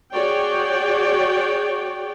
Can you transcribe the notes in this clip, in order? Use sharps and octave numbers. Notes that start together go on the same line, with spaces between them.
F#4 G#4 C#5 D5 G5